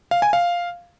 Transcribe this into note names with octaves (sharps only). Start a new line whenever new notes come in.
F5
G#5
F5